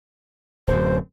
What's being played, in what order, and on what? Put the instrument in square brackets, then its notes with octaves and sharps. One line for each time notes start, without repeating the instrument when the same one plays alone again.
[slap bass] D1 F#2 [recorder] C5